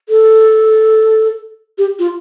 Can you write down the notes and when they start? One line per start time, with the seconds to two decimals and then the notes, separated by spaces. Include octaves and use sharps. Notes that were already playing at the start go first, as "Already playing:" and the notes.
0.09 A4
1.78 G4
1.99 F4